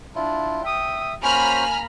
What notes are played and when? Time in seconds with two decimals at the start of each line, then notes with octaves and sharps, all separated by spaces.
0.16 D4 E4 F4
0.64 E5 G5 D#6
1.23 A#3 C#4 F#4 C5 G#5 A#5 B5 F6